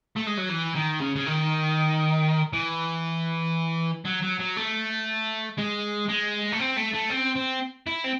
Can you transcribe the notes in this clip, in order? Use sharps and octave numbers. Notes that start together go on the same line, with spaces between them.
A3
G#3
F#3
E3
D#3
C#3
C#3
D#3
E3
F#3
F#3
F#3
A3
G#3
G#3
A3
C4
A3
A3
C4
C4
E4
C4